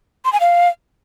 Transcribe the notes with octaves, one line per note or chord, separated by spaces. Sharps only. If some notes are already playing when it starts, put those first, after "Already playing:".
C6
G#5
F5